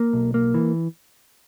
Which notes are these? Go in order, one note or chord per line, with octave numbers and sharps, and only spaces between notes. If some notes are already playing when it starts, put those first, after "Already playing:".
Already playing: A#3
B1
A#3
E3